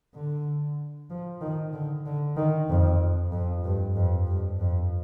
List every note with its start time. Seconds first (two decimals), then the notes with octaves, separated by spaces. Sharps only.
0.15 D3
1.10 F3
1.41 D#3
1.73 D3
2.06 D3
2.36 D#3
2.69 F2
3.32 F2
3.64 G2
3.95 F2
4.27 G2
4.60 F2